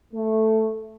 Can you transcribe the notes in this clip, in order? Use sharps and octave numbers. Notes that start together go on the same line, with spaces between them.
A3